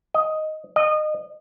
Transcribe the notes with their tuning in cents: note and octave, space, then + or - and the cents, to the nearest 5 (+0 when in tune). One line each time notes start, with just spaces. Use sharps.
D#5 +5
D#5 -25